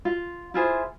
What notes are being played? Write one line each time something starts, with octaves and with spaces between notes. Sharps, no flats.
F4
E4 F4 G#4 C5